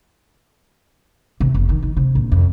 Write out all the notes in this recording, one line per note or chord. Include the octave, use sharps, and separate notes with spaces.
C3
F#1
D#3
D#3
C3
A#1
F2